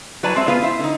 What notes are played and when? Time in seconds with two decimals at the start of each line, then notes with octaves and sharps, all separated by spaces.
0.23 F#3 E4 B4 D5 G#5 A5
0.35 G#3 C4 E5
0.48 B3 F4 G#4 B4 F5
0.62 E4 C5 E5
0.80 D3 D#4